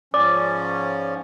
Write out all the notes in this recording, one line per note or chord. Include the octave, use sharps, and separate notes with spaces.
G#2 F3 C#4 D5 D6